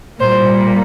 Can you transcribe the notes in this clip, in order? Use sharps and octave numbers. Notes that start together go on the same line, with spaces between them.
A#2 G3 A#3 C5